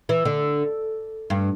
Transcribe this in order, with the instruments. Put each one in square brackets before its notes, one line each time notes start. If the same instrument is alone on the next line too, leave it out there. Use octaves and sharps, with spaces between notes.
[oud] E3
D3
G2